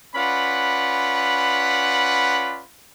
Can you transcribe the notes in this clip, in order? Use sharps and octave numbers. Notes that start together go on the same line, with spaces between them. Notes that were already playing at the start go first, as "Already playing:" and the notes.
C#4 F4 B4 D5 F#5 B5